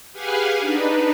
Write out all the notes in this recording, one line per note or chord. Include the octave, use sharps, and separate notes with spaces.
G4 G#4 B4 F5 F#5 G#5
D4 D#4 B4